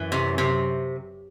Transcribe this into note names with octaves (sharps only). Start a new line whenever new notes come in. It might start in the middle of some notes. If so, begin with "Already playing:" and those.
Already playing: F#2 E3
C3
C3